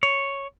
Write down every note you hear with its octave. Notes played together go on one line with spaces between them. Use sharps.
C#5